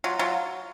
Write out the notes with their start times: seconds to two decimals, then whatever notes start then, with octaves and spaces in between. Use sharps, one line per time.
0.04 F#3 F4
0.19 F#3 F4